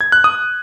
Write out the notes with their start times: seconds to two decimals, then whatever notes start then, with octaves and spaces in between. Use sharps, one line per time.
0.01 G#6
0.12 F#6
0.24 D#6